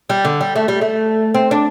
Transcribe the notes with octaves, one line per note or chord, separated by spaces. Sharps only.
G3
D3
G3
A3
G3
A3
C4
D4